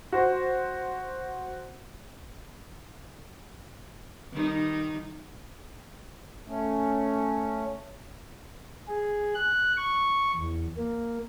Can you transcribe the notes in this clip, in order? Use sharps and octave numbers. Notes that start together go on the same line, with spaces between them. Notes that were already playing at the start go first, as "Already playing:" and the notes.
F#4 C5
D#3 G3 D#4
A3 C#4
G#4
F#6
C#6
E2
A#3